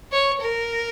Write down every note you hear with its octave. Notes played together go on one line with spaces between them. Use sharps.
C#5
A#4